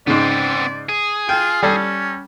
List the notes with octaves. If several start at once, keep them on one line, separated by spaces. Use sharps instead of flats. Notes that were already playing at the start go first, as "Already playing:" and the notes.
G#2 C#3 B3 C4 D5
G#4
F4 G5
G3 C#4 A4